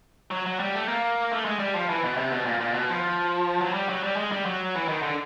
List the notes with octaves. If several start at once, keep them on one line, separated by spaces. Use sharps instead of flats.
F#3
F#3
G3
A3
A#3
A3
G#3
G3
F3
E3
B2
C3
B2
A#2
A#2
B2
F3
F#3
G3
F#3
G3
G#3
G3
F#3
E3
D#3
D3